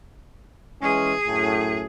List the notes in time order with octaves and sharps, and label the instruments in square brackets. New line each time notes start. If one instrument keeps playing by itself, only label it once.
[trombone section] E3 G#3 C#4 [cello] G#4
[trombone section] F#2 A2